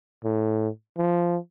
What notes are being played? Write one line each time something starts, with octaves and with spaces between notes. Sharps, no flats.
A2
F3